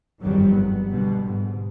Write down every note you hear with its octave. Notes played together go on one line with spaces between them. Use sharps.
G1 F2 G#2 D#3 F#3 G3
B3
B2 D3 G3
G#2